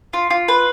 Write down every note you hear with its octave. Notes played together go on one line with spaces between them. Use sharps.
F4
F4
B4